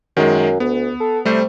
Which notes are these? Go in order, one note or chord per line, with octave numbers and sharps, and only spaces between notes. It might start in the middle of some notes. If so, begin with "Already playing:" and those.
F#2 D#3 G#3
D2 B3
A4
C3 G3 A3 C5